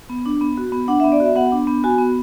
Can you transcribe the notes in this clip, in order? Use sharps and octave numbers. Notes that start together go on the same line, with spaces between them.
B3
D4
B3
F#4
B3
D4 F#5
E5
B3
D5
F#4 E5
B3 F#5
D4
B3
F#4 G#5
B3